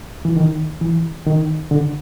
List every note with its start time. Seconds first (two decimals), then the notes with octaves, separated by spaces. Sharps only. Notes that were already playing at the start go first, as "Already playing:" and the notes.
0.25 E3
0.36 D#3
0.81 E3
1.27 D#3
1.71 D3